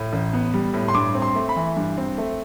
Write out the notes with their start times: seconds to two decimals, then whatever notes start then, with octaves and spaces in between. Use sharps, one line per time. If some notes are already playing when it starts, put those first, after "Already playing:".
Already playing: A2
0.13 A1
0.33 B3
0.54 G3
0.73 A2
0.88 C6
0.94 G2 D6
1.14 C4
1.22 C6
1.35 A3
1.49 B5
1.56 E3
1.76 G2
1.98 C4
2.18 A3